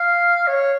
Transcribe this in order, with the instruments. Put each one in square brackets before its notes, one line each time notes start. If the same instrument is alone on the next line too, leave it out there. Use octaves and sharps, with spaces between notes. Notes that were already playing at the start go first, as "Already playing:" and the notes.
Already playing: [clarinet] F5
C#5